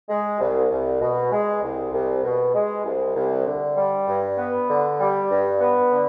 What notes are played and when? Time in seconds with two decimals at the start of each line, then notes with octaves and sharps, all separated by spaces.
0.09 G#3
0.40 C2
0.71 C2
1.01 B2
1.32 G#3
1.63 C2
1.93 C2
2.24 B2
2.54 G#3
2.85 C2
3.16 C2
3.46 D3
3.77 G3
4.07 G2
4.38 B3
4.69 D3
5.00 G3
5.30 G2
5.60 B3
5.91 D3